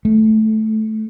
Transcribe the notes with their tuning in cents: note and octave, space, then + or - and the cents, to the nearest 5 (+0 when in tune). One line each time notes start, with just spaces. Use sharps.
A3 -10